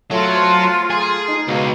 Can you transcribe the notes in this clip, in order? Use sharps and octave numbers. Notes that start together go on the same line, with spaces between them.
F#3 A3 F4 A4
C5
G#4 A#5
D#4
C#2 B2 F5